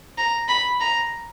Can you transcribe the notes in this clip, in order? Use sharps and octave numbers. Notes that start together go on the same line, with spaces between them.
A#5
B5
A#5